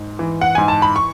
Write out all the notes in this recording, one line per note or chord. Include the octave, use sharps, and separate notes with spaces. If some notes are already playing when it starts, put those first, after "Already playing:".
Already playing: G#2
E3
F#5
G#2 G#5
A5
B5
C#6